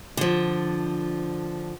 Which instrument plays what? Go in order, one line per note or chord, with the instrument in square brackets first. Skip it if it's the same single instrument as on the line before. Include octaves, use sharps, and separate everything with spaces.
[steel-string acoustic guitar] D3 F3